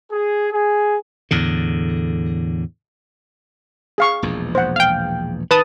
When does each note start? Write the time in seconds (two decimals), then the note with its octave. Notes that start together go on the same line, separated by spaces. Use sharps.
0.10 G#4
0.51 G#4
1.31 E2 A2 D3
3.98 G#4 F5 C#6
4.22 E1 A#1 E2
4.55 C5 F#5
4.76 F5 G5
5.51 D#3 B4 A5 D#6